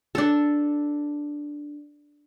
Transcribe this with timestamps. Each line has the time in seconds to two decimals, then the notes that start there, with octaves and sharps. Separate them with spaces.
0.15 D4 A4